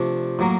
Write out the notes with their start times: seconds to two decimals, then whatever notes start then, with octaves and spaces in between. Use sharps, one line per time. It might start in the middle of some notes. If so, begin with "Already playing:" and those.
Already playing: C3 F3 A3 D4
0.39 A2 F#3 A#3